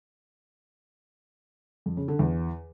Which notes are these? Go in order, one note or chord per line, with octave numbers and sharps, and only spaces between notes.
F2
C#3
D3
E2